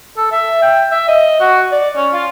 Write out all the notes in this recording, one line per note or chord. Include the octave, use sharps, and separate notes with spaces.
A4
E5
G5
E5
D#5
F#4
D5
C#4
F4